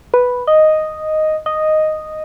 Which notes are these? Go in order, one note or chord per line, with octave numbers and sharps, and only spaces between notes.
B4
D#5
D#5